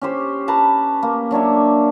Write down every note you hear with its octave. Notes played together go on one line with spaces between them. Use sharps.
C#4 G4 C5
B4 A5 A#5
A#3
F#3 D4 C#5 E5